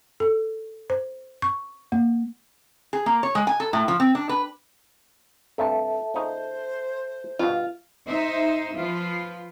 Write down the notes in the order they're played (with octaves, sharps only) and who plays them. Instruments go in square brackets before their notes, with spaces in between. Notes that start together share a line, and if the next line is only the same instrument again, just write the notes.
[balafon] A4
C5
C#6
A#3
[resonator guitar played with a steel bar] G#4
A#3
C#5
G#3
G#5
A4
A2
F3
C4
D4
B4
[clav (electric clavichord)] G2 C3 [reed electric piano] A4 E5 A5
[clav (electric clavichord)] A#2 C#3 D#4 [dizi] C5
[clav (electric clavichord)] G2 B2 [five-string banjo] F4
[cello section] D#4 C5 E5
F3 F4 B4